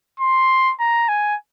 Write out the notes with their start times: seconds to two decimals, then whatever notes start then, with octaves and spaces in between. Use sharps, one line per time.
0.20 C6
0.80 A#5
1.08 G#5